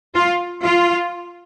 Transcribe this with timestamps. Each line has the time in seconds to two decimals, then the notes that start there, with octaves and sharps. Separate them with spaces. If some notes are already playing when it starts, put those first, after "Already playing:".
0.14 F4
0.62 F4